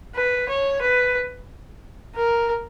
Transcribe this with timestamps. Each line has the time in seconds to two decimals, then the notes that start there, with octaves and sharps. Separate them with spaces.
0.15 B4
0.49 C#5
0.82 B4
2.15 A#4